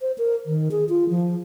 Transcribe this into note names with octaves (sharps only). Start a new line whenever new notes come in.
C5
A#4
D#3
G#4
F4
F3